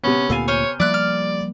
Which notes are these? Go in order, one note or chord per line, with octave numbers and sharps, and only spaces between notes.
C3 B3 C#4
D2 A#2 A4 F5 G#5
C5 C#5 G#5 F6
F3 G3 A#3 E4 D5 F#6
F6